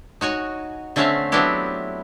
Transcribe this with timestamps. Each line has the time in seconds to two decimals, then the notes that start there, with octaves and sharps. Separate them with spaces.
0.21 D#4 F#4 C#5 G#5
0.96 D3 A3 C4 C#4 E5 F5
1.32 F#3 B3 C4 D4 E4 G4